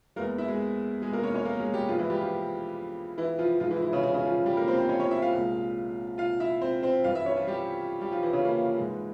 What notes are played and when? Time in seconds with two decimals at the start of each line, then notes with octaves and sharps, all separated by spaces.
0.16 E2 E3 G#3 A#3 A#4
0.38 E4 E5
0.48 G#3 G#4
1.02 G#3 G#4
1.13 A#3 A#4
1.23 C#4 C#5
1.34 C#4 C#5
1.45 A#3 A#4
1.60 G#3 G#4
1.73 G3 G4
1.88 G2 F3 G#3 F4
1.99 E3 E4
2.10 G3 G4
2.20 F3 F4
3.18 E3 E4
3.39 F3 F4
3.60 G#2 F3 G#3 F4
3.71 E3 E4
3.82 E3 E4
3.93 C#3 C#4
4.03 C#3 C#4
4.14 C#3 C#4
4.25 F3 F4
4.46 G3 G4
4.57 A#3 A#4
4.68 C4 C5
4.79 C4 C5
4.89 C#4 C#5
5.00 C#4 C#5
5.11 E4 E5
5.22 F4 F5
5.33 C2 A#2 G#3
6.18 F4 F5
6.40 E4 E5
6.61 C4 C5
6.82 C4 C5
7.04 G2 E3 G3 F4 F5
7.15 E4 E5
7.26 C#4 C#5
7.36 F3 F4
7.47 G3 G4
8.01 G3 G4
8.12 F3 F4
8.23 E3 E4
8.33 C#3 C#4
8.45 A#3
8.77 G#2 E3 G#3